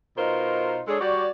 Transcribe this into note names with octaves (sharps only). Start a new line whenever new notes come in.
B2 D#4 F4 A#4 C5
G#3 D4 G#4 A4 C#5
G3 F#4 C#5 D5